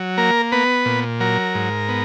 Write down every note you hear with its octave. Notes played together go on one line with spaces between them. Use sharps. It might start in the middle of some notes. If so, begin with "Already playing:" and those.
Already playing: F#3
A#3 A#4
B3 B4
A#2
F#3 A#4
G#2
B3